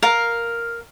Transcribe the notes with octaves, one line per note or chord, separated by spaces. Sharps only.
A#4 F5